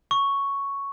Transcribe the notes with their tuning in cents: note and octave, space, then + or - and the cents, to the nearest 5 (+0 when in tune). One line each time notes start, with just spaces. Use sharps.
C#6 +5